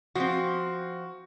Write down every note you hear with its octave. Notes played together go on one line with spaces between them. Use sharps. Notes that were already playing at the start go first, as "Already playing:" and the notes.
F3 C4 F#4